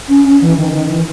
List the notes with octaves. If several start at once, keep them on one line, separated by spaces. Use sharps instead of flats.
C#4
C#4
E3
D#3
D#3
E3